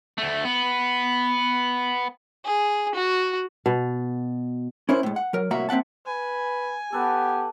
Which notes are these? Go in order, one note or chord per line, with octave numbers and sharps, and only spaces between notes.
D2 A3
B3
G#4
F#4
B2
C#4 E4 A#4 C5
A2 G#3
F#5
F#3 A#4
C2 A2 A#3 F#4 E5 A#5
A#3 C4 E5 F#5 A5
B4 G#5
B3 G4 A4 B4